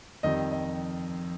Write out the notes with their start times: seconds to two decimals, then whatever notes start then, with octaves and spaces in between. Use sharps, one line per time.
0.23 F2 D#3 G3 D#5
0.52 D#5